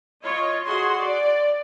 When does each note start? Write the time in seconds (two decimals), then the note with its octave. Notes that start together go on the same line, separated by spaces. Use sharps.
0.24 F4 C#5 D#5
0.64 F#4 G#4 C6
0.98 D5